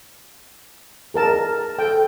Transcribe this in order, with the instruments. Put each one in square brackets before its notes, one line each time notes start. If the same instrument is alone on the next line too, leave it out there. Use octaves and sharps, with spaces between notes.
[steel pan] G#4 A#4 A5
[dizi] A4 [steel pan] G5